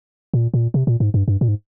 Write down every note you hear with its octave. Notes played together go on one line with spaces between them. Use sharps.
A#2
A#2
C3
A#2
G#2
G2
G2
A#2
G#2